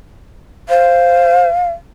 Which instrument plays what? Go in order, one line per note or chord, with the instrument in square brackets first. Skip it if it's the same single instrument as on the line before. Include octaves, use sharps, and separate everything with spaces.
[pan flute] C5 [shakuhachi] F5